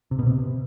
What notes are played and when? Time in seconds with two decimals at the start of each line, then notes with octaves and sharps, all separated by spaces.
0.11 C3
0.19 B2
0.26 C3